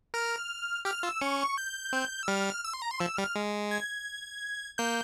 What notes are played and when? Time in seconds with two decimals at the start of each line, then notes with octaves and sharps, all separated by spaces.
0.14 A#4 F6
0.85 G4 F6
1.03 F4 E6
1.21 C#4 C#6
1.57 G6
1.93 C4
2.23 E6
2.28 G3 F6
2.64 E6
2.73 C6
2.82 A#5
2.91 C6
3.00 F3 E6
3.17 G3 F6
3.36 G#3
3.71 G#6
4.78 A#3 G6